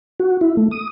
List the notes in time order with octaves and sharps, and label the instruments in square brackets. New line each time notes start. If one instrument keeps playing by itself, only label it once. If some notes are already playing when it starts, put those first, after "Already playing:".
[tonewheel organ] F#4
E4
A3
D#6